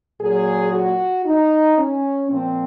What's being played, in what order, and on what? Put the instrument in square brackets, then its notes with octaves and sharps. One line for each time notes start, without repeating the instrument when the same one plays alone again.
[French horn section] A#2 F#3 G#4
F#4
D#4
C#4
A#2 F3 C4